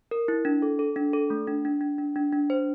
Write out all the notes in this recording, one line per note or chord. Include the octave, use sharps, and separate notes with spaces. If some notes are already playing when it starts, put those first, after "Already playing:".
A#4
E4
D4
A4
A4
D4
A4
A3
D4
D4
D4
D4
D4
D4
C5